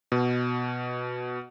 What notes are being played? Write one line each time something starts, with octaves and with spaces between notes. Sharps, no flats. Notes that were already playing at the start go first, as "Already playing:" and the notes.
B2